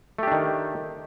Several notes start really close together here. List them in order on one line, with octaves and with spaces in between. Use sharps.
A3 G4 D4 D#3